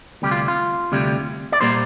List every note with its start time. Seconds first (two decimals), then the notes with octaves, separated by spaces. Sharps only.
0.22 D2 C3 G3 G4
0.31 F4
0.48 F4
0.92 D2 C3 G3
1.52 D5
1.61 A#2 G3 A#3 C5